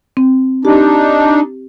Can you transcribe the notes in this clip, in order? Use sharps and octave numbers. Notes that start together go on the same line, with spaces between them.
C4
D4 D#4 G4